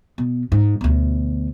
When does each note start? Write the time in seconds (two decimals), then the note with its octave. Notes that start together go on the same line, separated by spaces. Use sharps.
0.18 B2
0.52 G#2
0.81 D2 B2